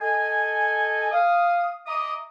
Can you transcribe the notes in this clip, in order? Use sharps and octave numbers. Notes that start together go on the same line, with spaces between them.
A4 D#5 G#5
F5 D#6
D#5 E5 A#5 D6 D#6